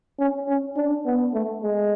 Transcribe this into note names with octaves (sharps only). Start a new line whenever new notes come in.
C#4
C#4
D4
B3
A3
G#3